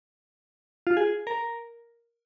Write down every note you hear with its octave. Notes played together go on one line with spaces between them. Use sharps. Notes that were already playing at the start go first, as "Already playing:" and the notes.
F4
G#4
A#4